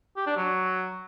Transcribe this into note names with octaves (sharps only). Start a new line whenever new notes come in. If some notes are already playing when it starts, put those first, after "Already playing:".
G4
D4
F#3